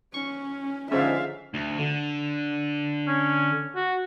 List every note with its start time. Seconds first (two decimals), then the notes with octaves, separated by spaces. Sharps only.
0.14 C#4 C#6
0.92 G#2 D3 F3 C#4 E5 F5
1.54 D2
1.79 D3
3.08 C#4
3.76 F#4